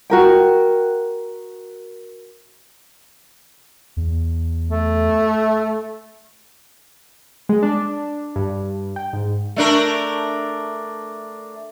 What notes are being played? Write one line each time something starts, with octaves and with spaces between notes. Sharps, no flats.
F#4 A#4 G5
E2
A3
G#3
D4
G2
G5
G#2
A3 D4 A#4